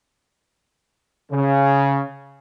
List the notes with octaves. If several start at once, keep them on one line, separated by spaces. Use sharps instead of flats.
C#3